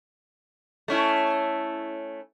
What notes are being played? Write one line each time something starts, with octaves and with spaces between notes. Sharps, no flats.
A3 C#4 E4